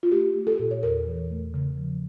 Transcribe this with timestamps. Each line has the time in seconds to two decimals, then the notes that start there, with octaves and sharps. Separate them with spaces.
0.03 F4
0.11 A3 G4
0.35 A3
0.47 A4
0.59 A#2
0.71 C#5
0.83 E2 A#4
1.07 E3
1.31 A3
1.54 C#3
1.78 F3